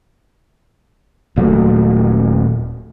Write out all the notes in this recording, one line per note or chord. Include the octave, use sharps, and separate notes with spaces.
D#1 A#2 F#3 A3